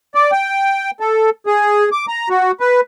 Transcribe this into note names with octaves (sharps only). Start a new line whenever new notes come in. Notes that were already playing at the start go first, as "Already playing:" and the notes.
D5
G5
A4
G#4
D6
A#5
F#4
B4